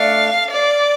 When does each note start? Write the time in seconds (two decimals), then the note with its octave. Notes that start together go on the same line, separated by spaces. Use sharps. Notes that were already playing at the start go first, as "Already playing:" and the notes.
Already playing: A3 D4 F5
0.51 D5